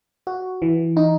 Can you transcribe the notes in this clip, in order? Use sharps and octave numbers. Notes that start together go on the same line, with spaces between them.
F#4
E3
D#4